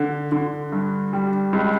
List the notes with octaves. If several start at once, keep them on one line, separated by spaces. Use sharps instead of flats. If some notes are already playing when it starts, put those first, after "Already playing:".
Already playing: D3
D3
G2
G3
C#2